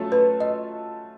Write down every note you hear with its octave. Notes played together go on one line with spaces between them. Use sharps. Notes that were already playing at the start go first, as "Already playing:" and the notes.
Already playing: F#3 A3 C#4 F4 A4
B4
D#5